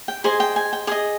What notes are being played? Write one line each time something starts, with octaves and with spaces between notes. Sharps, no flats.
G5
G#4 C5 D#5 G#5
G5
G#5
G5
G#4 D#5 D#6